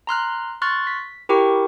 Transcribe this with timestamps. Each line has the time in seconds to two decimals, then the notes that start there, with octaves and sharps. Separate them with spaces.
0.07 A#5 C6 F6 F#6
0.62 C6 C#6 F6 F#6 A6
0.87 B6
1.29 E4 G4 A#4 G5 C#6 D6